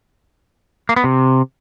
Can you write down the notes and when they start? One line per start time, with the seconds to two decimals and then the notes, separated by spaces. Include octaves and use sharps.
0.89 A#3
0.96 B3
1.04 C3